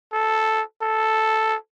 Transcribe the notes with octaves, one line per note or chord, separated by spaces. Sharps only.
A4
A4